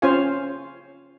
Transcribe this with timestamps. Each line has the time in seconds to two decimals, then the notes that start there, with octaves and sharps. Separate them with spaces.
0.02 C#4 F4 C5 C#5 F5 G#5